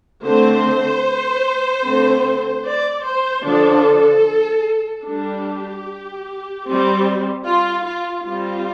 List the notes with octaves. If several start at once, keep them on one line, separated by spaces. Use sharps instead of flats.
D3 A3 C4 C5
D3 A3 C4
D5
C5
D3 F3 D4 A4
G3 D4 G4
G3 C4
F4
F4
G3 C4 F4